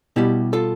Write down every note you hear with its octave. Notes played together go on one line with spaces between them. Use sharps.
B2 G3 E4 G4
F4 A4